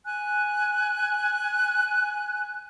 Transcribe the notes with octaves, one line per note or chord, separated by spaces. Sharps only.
G#5 F#6